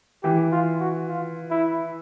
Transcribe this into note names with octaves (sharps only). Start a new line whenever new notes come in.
E3 G4
F4
F#4
F4
E4